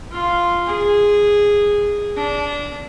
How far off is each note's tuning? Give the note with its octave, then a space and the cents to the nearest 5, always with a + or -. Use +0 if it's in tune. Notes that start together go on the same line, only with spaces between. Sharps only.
F4 -5
G#4 -10
D4 -20